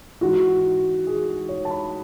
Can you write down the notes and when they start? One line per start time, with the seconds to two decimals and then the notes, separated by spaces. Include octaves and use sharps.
0.21 G#2 E3 F#4
1.07 G#4
1.49 C#5
1.65 A5
1.71 B5